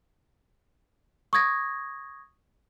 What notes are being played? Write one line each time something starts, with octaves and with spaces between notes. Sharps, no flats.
C#6 D#6 G#6 A#6